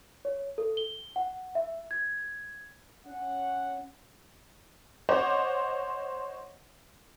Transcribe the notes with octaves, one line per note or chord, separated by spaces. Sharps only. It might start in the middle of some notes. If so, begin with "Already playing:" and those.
C#5
A4
G7
F#5
E5
G#6
C#4 F#5
C5 C#5 D#5 F#5 D6